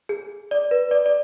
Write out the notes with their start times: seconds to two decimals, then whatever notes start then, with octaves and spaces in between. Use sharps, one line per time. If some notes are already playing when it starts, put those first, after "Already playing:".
0.09 G#4
0.51 D5
0.71 B4
0.91 D5
1.06 D5